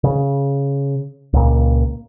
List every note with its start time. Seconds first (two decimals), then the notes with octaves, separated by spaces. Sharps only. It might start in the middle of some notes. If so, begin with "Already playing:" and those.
0.04 C#3
1.33 C#2 A#2